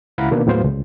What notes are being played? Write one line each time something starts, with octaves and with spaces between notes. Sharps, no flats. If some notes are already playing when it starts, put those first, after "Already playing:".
C#2 E4 F5 F#5 A#5 B5
B2 D#3 A#3 B3 D4
D#2 A2 F#3 B3 C5 F5
C#2